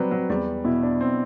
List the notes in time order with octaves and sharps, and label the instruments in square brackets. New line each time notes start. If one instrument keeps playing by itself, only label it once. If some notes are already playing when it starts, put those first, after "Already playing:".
Already playing: [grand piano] F#3 G3 [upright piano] C4 B4
[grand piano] F#3
[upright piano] E2 [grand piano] G3
[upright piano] B2 [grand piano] E4
[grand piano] D4
C4